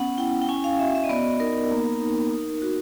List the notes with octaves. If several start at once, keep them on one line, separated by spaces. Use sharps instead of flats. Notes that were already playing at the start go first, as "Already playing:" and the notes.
Already playing: B3 C#4 F#5
E4 G5
G5
C#4 G#5
F5
F#4 E5
E5
D#5
B3 D5
D#4 A#4
A#3
D#4
D#4
F#4